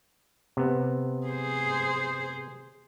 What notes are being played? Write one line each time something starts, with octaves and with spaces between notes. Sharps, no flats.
C3 B3
G#4 C5